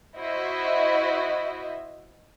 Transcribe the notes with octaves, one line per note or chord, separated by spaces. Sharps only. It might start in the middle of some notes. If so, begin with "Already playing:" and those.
E4 F#4 C5 D#5 E5